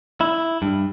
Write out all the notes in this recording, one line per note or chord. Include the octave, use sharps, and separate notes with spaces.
E4
G2